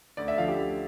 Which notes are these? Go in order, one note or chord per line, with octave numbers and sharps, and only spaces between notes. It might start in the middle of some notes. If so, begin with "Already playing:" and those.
D2 D5
E5
D3 F3 F5
G4
D2